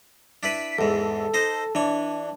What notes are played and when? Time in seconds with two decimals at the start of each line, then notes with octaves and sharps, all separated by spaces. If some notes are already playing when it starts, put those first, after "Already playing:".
0.43 D4 E4 B4 B6
0.79 E2 G#2 A4
1.34 D#4 C5 D#5
1.75 E3 D4 C#5